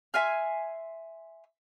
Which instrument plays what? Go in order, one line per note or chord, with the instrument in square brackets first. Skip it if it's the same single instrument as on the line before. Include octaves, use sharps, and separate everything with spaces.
[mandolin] E5 G#5 C6 F6